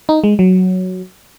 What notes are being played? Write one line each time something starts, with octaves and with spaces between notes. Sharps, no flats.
D#4
G#3
F#3